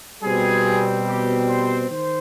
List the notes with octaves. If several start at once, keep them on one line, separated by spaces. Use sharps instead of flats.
B2 G3 C4 G#4
G4
C5
D#3 C5